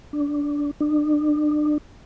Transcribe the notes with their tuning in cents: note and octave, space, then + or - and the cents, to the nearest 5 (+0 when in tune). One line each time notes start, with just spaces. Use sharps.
D4 -15
D4 +35